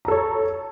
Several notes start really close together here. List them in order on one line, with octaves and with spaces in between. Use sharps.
A#5 A4 C#5